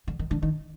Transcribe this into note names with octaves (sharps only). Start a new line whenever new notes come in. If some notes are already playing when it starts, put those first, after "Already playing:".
D3
D#3
D3
D#3